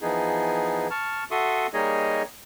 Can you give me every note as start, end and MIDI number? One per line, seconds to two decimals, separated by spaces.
0.01 0.88 52
0.01 0.88 53
0.01 0.88 59
0.01 0.88 63
0.01 0.88 68
0.91 1.24 81
0.91 1.24 85
0.91 1.24 89
1.31 1.67 66
1.31 1.67 69
1.31 1.67 76
1.31 1.67 84
1.31 1.67 85
1.31 1.67 87
1.74 2.23 55
1.74 2.23 58
1.74 2.23 63
1.74 2.23 68
1.74 2.23 73
1.74 2.23 75